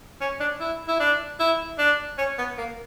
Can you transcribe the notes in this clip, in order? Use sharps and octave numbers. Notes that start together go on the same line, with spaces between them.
C#4
D4
E4
E4
D4
E4
D4
C#4
B3
A#3